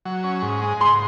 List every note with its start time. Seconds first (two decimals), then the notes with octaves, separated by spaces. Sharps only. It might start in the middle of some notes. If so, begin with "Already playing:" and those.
0.05 F#3
0.24 C#4
0.42 G#2
0.62 G#3
0.80 G#2 C6